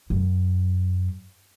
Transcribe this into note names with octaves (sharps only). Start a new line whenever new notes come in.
F#2